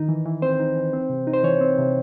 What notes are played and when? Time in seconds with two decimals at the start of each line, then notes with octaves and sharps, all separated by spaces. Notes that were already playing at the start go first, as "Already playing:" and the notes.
Already playing: D#3 D#4
0.09 E3
0.25 E3
0.42 C4 C5
0.60 D#4
0.76 E3
0.93 C4
1.09 C3
1.27 D#4
1.34 C5
1.44 E3 C#5
1.61 C4
1.78 C3